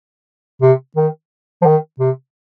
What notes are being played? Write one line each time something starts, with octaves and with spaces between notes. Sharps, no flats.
C3
D#3
F3
D#3
C3